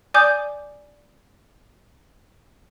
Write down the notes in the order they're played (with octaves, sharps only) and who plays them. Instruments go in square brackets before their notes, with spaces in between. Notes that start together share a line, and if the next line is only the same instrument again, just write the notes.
[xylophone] D5 G#5 D6 D#6 G6